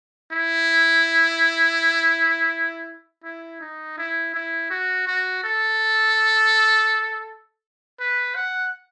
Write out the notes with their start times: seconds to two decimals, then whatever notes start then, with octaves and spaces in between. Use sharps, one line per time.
0.31 E4
3.24 E4
3.61 D#4
3.98 E4
4.34 E4
4.70 F#4
5.07 F#4
5.43 A4
8.00 B4
8.35 F#5